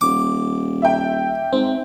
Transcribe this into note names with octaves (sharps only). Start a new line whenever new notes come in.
D#1 D6
E5 G5
G#2 C4